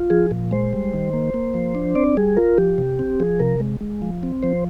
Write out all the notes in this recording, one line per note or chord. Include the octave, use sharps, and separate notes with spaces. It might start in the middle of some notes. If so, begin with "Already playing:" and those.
Already playing: F4
F3 G#4
A#2
G#3 C5
G3
D#3
A#3
A#3
F3
D4
C4 D5
G3 G#4
F4 A#4
F3 G4
C3
C4
F3 G#4
C3 A#4
G#3
G#3
F3
C4
F3 C5